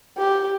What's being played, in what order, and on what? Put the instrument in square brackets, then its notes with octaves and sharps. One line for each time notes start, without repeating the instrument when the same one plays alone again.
[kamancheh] G4